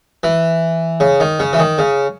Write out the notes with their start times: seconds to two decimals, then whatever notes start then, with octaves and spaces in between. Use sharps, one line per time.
0.23 E3
1.00 C#3
1.20 D#3
1.40 C#3
1.53 E3
1.59 D#3
1.78 C#3